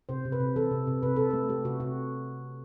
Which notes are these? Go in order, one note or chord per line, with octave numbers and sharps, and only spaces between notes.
C3 C5
C3
B4
C3
E3 A4
C3
C3
C3 B4
C3 A4
A3 B4
A3 G4
C3 F#4
C3 F#4